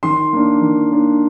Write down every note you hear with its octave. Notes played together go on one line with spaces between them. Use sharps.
D#3 C6
A#3 D4
D#3
A#3 D4